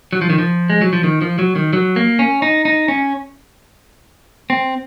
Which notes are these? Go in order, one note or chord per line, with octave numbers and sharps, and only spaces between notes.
F#3
F3
D#3
F3
G#3
F#3
F3
D#3
F3
F#3
D#3
F#3
A#3
C#4
D#4
D#4
C#4
C4